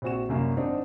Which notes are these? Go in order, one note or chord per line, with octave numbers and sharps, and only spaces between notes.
A#1 C4 F#4 E7
C2 F#2 A#3 C#4
G#1 C4 D4 D#4